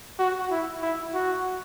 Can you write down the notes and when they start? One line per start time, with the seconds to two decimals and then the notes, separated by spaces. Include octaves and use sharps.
0.19 F#4
0.51 E4
0.82 E4
1.13 F#4